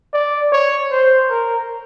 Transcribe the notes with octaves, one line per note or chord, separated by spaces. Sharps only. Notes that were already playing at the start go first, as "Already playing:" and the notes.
D5
C#5
C5
A#4